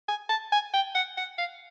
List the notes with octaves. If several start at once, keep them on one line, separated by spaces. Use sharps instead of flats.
G#5
A5
G#5
G5
F#5
F#5
F5